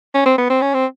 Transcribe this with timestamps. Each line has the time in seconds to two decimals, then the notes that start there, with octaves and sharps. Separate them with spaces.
0.14 C#4
0.26 C4
0.38 B3
0.50 C4
0.62 C#4
0.74 C4